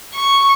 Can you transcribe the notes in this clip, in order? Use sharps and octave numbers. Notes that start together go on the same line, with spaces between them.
C#6